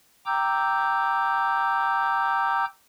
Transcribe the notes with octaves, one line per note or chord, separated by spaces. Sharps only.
G5 A#5 D6 E6 G6